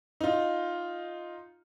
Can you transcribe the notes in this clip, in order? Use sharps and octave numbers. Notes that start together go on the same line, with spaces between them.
D#4 F4